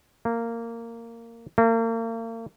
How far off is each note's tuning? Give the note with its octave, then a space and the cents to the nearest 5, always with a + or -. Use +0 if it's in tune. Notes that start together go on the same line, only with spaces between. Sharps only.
A#3 -15
A#3 -40